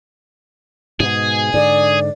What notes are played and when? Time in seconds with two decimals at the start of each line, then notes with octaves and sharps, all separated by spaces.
1.00 G#2 B2 G#4
1.54 G#2 D3 D5